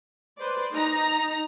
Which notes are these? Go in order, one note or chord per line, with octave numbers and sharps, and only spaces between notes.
B4 C5 D5
D#4 A#5